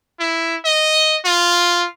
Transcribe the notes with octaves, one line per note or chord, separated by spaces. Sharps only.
E4
D#5
F4